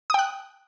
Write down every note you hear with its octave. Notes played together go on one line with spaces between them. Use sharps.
G5 D#6 F#6